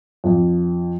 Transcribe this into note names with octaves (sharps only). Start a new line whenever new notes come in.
F2